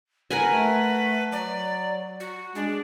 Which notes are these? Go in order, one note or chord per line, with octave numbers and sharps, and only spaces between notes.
A#4 B4 F#5 G#5
A3
F#3 D5
F#4
G#3 D4